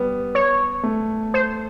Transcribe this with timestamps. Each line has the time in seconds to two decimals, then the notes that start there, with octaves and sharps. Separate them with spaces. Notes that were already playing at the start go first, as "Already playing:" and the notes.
Already playing: G3 B3
0.35 C#5
0.83 A3
1.34 C5